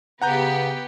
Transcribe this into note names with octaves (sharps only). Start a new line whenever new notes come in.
C#3 B3 G4 F#5 A#5 G6